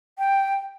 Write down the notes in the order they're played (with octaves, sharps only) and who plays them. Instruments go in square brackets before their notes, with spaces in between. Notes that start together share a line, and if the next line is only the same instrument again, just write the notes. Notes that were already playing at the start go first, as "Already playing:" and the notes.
[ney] G5